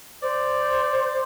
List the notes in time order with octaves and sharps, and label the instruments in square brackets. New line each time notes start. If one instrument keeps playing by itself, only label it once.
[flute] C5 [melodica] D5